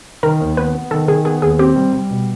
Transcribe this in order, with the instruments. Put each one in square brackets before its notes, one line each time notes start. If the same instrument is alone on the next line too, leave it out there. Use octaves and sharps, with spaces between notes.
[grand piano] D#3 [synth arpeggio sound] A#4
[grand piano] D#2
[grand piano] B3 [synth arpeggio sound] B4
[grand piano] B3
[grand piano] D#3 [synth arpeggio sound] A4
[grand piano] D#3 [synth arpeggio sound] G#4
[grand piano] B3 [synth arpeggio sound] G#4
[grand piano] D#2 [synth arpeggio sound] G#4
[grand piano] C4 [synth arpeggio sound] G4
[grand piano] G3
G3
B2